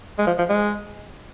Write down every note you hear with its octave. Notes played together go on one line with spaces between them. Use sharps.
G#3
F3
F3
G#3